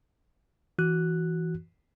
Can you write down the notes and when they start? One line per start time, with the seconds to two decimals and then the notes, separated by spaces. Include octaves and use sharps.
0.78 E3 F#4 F#6